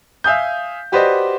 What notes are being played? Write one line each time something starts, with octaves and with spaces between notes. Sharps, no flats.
E5 F5 G#5 D#6 G6
F#4 G4 B4 C5 D5 D#5